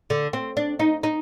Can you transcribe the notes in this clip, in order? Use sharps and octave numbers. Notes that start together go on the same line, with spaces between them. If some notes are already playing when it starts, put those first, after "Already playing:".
D3
C4
D4
D#4
D#4